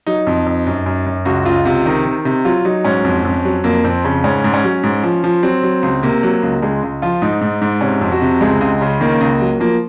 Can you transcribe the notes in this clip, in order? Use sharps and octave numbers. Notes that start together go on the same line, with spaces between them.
F#3 D#4
F2
F2
F#2
F#2
F#2
C#2 F#4
C#2 F4
C3 F4
D#3 D#4
D#3
C3
F#3 F4
F#3 D#4
G#2 C#4
F2
F2
F#3
F2 A#3
F2 C4
C#3
G#2 C#4
G#2
C#4
F#3
G#2
F3
F3
F#3 C4
F#3
C#2
C3 A#3
F#3
C#2
C#2 G#3
C#2
F3 F4
G#2 D#4
G#2
G#2
C3 C#4
F2
F#4
C3
C#2 G#3
C#2
C#3
D#3 A#3
C#2
F#3
F3 A#3